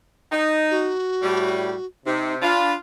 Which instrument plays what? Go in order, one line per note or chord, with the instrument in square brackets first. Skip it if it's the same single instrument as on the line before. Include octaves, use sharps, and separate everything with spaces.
[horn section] D#4
[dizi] F#4
[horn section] A2 G3
[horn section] C3 [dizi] D#4
[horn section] D4 F4 [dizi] B5